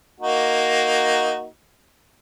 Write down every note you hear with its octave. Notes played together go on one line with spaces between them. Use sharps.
A#3 D#4 F#4